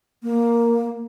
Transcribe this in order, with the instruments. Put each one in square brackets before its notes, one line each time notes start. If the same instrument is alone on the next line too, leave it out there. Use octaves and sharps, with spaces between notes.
[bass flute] A#3